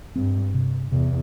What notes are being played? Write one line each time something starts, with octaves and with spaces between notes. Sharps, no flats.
G2 C4
C3
E2 C3